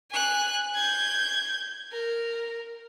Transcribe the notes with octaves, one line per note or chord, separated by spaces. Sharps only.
G#5 F#6
G6 G#6
A#4